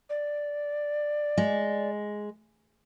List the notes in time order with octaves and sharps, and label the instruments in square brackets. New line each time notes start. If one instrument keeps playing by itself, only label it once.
[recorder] D5
[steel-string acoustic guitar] G#3